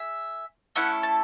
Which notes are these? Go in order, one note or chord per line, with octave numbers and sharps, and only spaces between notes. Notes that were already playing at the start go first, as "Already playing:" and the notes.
Already playing: G#4 E5
A3 C#4 E4 A4 F#5
A5